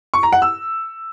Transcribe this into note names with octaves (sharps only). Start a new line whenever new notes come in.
C#6
A#5
F#5
E6